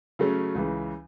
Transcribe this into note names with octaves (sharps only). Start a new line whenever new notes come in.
C#3 F#3 A3 C#4
C#2 C#3 E3